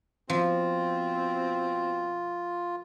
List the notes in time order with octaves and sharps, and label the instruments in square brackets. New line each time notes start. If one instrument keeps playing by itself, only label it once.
[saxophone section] B2 C4 [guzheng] F3 [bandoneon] F4